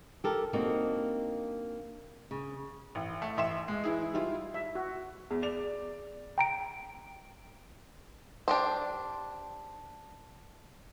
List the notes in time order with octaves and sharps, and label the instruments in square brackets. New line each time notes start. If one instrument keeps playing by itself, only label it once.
[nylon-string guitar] G4 A4 A#4
A#3 C4 D4 D#4 F#4
C#3
[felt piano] A1
A3
A1 E5 C6 E7
G#3
E3 E4 G#4
G3 E4 F4
[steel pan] E5
F#4
[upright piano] E2 [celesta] G#4
[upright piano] D5 F7
[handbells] G5 A#5 D7
[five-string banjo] D4 G4 C5